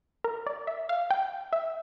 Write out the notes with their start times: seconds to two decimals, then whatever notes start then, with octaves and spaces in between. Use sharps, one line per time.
0.24 A#4
0.47 D5
0.67 E5
0.89 F5
1.11 G5
1.53 E5